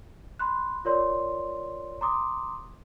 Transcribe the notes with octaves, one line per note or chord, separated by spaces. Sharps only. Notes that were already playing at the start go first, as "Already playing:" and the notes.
B5 C6 F#6
F4 A#4 C#5 D5 C6
A#5 C6 D6 D#6